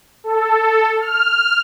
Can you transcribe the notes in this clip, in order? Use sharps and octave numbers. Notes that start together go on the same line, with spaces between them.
A4
F6